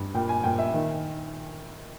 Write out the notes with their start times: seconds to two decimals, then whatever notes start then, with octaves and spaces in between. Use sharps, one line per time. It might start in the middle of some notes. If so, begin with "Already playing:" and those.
Already playing: G2
0.14 A#2 G5
0.29 G#5
0.44 A#2 G5
0.59 E5
0.73 D#3